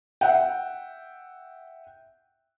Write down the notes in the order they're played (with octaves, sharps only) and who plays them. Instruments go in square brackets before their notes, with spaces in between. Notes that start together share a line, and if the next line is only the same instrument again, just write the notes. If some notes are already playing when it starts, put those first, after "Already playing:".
[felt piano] E5 F#5 G5